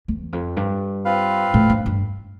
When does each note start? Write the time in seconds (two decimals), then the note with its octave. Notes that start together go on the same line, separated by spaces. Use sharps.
0.08 E2
0.33 F2
0.57 G2
1.05 C4 F4 B4 F5
1.54 A2
1.69 G2
1.86 G2